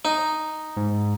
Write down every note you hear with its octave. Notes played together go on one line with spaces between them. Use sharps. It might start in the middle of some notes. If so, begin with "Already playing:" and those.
D#4
G#2